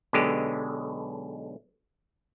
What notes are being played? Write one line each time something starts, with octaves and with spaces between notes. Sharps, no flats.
B1 B2 D3 G#3 G4